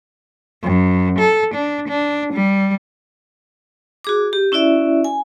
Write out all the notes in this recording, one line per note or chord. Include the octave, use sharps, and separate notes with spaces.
F#2
A4
D4
D4
G3
F#4 G#4 D6
G4
C#4 E4 F#4 D5 E5
G#5